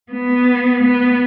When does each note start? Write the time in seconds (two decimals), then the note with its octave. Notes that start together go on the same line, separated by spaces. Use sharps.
0.12 B3
0.83 B3